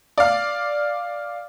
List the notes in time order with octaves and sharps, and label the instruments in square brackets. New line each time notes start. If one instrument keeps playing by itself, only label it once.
[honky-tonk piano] D5 F5